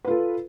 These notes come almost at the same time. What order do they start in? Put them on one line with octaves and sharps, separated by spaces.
B4 F4 A4